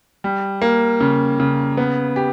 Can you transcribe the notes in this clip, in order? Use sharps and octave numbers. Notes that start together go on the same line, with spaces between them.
G3
A#3
C#3
C#3
B3
G4